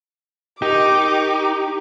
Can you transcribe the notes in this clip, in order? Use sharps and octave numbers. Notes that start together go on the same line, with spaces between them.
D#4 G4 A#4 D6